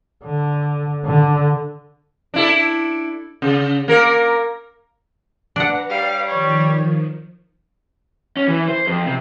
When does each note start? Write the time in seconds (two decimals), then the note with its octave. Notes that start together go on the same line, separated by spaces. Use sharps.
0.25 D3
1.05 D3
2.34 D4 E4 A4
3.42 C#3
3.88 A#3 A#4
5.56 D4 B4 F#5 A#5
5.90 G3 C#5 D5 F5
6.27 D#3 F3 C#5
8.37 C#4
8.48 E3
8.68 C5
8.87 F2
9.06 C3